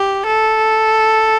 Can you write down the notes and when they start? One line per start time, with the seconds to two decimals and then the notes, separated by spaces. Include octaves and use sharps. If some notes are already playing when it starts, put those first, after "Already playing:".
Already playing: G4
0.26 A4